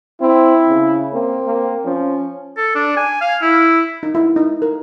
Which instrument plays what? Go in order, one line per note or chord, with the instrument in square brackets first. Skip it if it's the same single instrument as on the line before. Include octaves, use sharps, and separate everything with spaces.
[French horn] C4 [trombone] E4
[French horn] C#3
[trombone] A#3 [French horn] C4
[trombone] A#3
[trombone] F3 [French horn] C#4
[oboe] A4
D4
G#5
F5
E4
[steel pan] D#4
E4
D#4
A#4